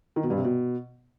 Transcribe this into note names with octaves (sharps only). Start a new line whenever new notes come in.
D#3
B2
G2
C3
B2